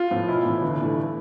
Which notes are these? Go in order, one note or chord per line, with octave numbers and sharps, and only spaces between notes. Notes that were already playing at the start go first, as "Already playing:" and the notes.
Already playing: F4
A2 F3 B3
B1 E4
A2 E3
G1
G2 E3 A3